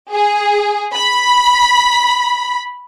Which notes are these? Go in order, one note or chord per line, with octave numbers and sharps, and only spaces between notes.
G#4
B5